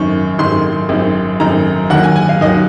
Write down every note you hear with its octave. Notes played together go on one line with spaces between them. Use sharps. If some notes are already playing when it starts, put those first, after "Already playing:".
Already playing: G#1 F#2 D#3 C#6
G#1 F#2 D#3 C6
G#1 F#2 D#3
G#1 F#2 D#3 A#5
D#2 D#3 F#3 F#5
G#5
G#5
F5
D#2 D#3 F#3 D#5